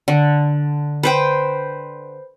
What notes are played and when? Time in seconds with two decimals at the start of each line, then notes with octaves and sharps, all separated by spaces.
0.08 D3
1.03 B4 C5 G5